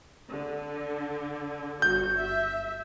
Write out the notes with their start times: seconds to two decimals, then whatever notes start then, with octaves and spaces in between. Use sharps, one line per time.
0.29 D3
1.82 G1 F#4 G6
2.19 E5